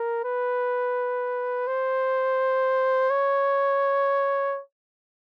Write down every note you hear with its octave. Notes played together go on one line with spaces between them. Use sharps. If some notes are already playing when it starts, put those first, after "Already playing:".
Already playing: A#4
B4
C5
C#5